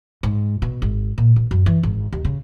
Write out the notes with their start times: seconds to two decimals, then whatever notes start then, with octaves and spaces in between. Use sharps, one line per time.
0.23 G#2
0.62 B2
0.82 G#1
1.18 A#2
1.36 B1
1.51 F#2
1.66 E3
1.83 G#1
2.12 D#2
2.25 C#3